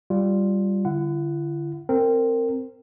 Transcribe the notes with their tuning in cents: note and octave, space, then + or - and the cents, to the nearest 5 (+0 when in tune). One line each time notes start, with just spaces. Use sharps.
G3 +0 F4 +0
D3 +0 E4 +45 F#5 +0
C4 +0 A#4 -20